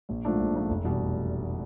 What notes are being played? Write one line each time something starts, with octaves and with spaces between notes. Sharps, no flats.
A#1
G#2 F3 A3 D4
A#1
G#2 F3 A3 D4
F1
E2 B2 G3